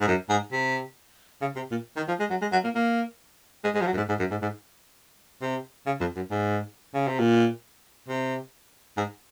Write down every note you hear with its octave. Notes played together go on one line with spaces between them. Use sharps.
G#2
F#2
G#2
C3
C#3
C3
A#2
D#3
F3
G#3
F#3
G#3
F#3
A#3
A#3
G#3
G#3
F3
F#3
F#2
G#2
G#2
F#2
G#2
G#2
C3
C#3
F2
F#2
G#2
C#3
C3
A#2
C3
G#2